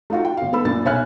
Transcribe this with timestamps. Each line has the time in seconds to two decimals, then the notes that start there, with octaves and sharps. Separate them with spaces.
0.10 A3 D#4 F4 F#4
0.25 G5
0.37 G1 F5
0.53 B3 A4 B5 E6
0.65 F#2 A#2 D4 A6
0.85 B1 C#5 E5 G#5 F6 F#6